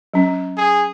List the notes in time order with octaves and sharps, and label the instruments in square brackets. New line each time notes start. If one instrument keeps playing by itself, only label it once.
[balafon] F#3 C#4
[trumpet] G#4